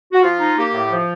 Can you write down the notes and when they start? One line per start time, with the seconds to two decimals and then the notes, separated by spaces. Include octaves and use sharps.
0.13 F#4
0.23 F3 F4
0.40 D#4
0.57 A#3 G4
0.74 A2
0.91 F3